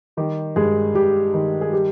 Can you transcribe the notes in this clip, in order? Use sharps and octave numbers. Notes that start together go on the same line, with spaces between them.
D#3 G3 G4
G2 G#3 G#4
G2 G3 G4
D#3
G#4
G3 G4